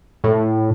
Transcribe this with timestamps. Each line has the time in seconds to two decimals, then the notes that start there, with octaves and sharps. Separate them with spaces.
0.24 A2